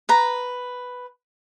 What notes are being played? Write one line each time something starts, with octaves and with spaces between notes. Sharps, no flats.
B4 A#5